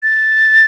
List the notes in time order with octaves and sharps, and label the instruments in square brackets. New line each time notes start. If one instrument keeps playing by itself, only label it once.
[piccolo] A6